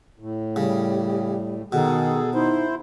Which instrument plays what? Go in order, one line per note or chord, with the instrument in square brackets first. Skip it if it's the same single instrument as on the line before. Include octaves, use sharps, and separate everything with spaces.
[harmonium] A2
[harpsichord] C#3 [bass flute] G3
[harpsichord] B2 [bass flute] D#3 [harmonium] G#4 A4
[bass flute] D#4 [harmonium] E4 C5